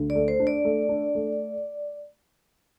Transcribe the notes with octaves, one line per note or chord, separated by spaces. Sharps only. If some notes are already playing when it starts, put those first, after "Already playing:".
Already playing: D2
D5
A3
C5
D4
D5
A3
D4
A3